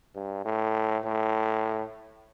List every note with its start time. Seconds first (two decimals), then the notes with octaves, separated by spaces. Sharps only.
0.15 G2
0.45 A2
1.04 A2